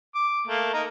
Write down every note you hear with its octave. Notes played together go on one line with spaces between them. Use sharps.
D6
A3 A#3
D#4 A#4